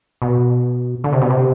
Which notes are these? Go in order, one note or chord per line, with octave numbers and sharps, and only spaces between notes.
B2
D3
C3
B2
C3